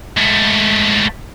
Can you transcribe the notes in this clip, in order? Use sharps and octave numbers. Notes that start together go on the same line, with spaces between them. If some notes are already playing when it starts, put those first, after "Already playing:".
G#2 A3